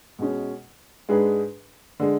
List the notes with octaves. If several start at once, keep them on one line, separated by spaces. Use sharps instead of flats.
B2 G#3 C#4
G#2 G#3 D4 G#4 B4
D3 G#3